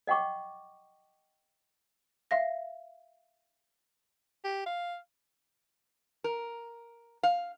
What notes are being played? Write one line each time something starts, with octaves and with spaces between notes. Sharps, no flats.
D#5 F#5 G5 C#6 D6
E5 F5 A#6
G4
F5
A#4
F5